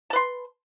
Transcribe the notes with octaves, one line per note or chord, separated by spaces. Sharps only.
B4 A5 C6